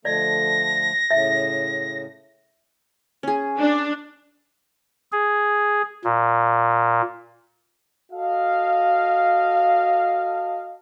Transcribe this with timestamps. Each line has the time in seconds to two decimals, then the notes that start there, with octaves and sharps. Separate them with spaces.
0.05 D3 F3 A3 D5 D#5 A#6
1.11 A2 C#3 E5
3.23 C#4 G#4
3.58 D4
5.12 G#4
6.04 A#2
8.12 F#4 A4 D#5 F5